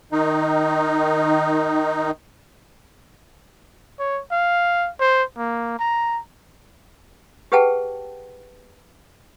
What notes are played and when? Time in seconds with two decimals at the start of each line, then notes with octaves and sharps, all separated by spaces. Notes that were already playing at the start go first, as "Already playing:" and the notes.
0.12 D#3 D#4
3.99 C#5
4.32 F5
5.00 C5
5.38 A#3
5.79 A#5
7.52 G4 G#4 B4 F#5 G5 A5